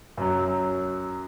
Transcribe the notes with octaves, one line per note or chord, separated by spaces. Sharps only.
F#2 F#3